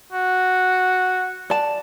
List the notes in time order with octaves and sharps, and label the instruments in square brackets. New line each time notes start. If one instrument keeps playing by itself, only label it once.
[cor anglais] F#4
[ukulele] D5 A5